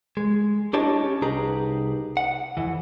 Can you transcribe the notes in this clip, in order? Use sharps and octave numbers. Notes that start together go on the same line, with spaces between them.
G#3
D4 E4 G4 C#5 D#5 A5
C#4
C2 D#4 G4 G#4 B4 A#5
F#5
F2 E3